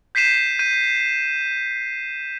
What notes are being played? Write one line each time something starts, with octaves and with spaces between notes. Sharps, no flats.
G6 B6 C7 D#7 E7
G6 D#7